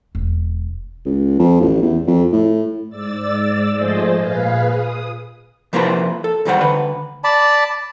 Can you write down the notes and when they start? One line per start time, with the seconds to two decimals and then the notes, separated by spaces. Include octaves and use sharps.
0.15 E1
1.06 C#2
1.39 F2
1.61 A1
1.82 E2
2.07 F2
2.32 A2
2.89 G#2 D5 E6 A6
3.73 G#2 F3 A3 G#4 C5 D#5
4.15 A#2 G#4 B4 F5
4.71 D#6
5.73 C3 F3 A#3 E4 B4 C5
6.24 A4
6.45 B1 E2 D#3 G3 C5 F#5
6.61 D2 D3 B4
7.24 D5 A5 B5